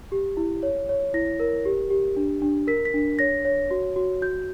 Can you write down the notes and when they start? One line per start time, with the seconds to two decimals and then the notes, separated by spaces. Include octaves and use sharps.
0.12 G4
0.37 E4
0.63 C#5
0.89 C#5
1.14 E4 A#6
1.40 A#4
1.65 G4
1.90 G4
2.16 D4
2.42 D4
2.67 A#4 B6
2.85 B6
2.94 D4
3.19 C#5 A#6
3.45 C#5
3.71 F#4
3.96 F#4
4.22 F#4 G6